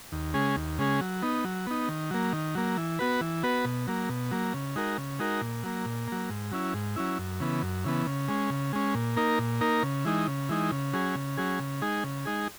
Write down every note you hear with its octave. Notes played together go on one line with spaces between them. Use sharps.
D#2
C#3 G#3 C#4 G#4
D#2
C#3 G#3 C#4 G#4
F#3
B3 D#4
F#3
B3 D#4
D#3
F#3 A#3
D#3
F#3 A#3
E3
B3 F#4 B4
E3
B3 F#4 B4
B2
F#3 A#3
B2
F#3 A#3
C#3
G#3 D#4 F#4 A#4
C#3
G#3 D#4 F#4 A#4
A#2
F#3 A#3
A#2
F#3 A#3
G#2
F#3 C#4 E4
G#2
F#3 C#4 E4
F#2
C#3 E3 B3
F#2
C#3 E3 B3
C#3
G#3 C#4
C#3
G#3 C#4
A#2
A#3 D#4 A#4
A#2
A#3 D#4 A#4
C#3
E3 G#3 D#4
C#3
E3 G#3 D#4
C#3
F#3 C#4 G#4
C#3
F#3 C#4 G#4
C#3
G#3 D#4 G#4
C#3
G#3 D#4 G#4